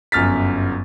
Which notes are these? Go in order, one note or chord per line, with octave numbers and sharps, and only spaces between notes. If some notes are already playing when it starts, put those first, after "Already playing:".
G1 F#2 F6 A6 B6